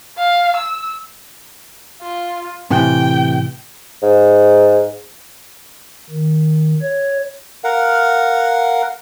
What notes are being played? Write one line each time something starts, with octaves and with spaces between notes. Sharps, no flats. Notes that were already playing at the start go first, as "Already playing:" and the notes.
F5
E6
F4
A2 C3 E3 G5
G#2
D#3
C#5
A#4 F5 F#5